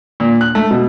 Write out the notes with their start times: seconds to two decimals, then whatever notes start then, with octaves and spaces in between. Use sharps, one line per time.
0.20 A#2
0.41 F#6
0.55 A3
0.71 B2